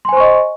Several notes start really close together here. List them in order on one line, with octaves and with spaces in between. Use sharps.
C6 G#5 C5 C#6 D#5